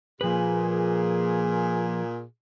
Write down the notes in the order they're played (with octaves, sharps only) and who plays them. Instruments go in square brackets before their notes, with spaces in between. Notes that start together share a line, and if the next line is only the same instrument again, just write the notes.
[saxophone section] A#2 G#4 [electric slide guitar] F3 B4